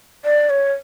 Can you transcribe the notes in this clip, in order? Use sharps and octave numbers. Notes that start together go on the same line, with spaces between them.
D5
C#5